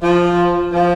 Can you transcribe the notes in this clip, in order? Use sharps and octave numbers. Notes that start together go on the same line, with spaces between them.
F3
F3